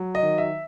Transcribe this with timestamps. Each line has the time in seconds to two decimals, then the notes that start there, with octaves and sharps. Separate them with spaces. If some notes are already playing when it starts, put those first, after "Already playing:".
Already playing: F#3
0.15 D#5
0.23 D#3
0.38 E5